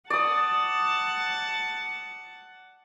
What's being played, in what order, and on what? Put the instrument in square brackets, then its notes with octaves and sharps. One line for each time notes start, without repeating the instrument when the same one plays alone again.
[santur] D5 D#6 [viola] F#5 A5